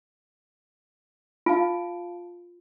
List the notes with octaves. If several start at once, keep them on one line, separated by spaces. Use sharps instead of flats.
F4 F5 A5 D7